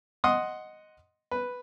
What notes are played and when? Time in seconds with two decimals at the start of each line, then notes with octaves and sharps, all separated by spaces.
0.24 D#5 F#5 C6 D#6
1.31 B4